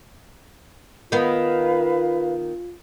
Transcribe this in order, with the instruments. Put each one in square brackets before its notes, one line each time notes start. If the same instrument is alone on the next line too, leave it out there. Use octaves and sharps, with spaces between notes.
[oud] D#3 B3 [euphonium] F4 [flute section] B4 F5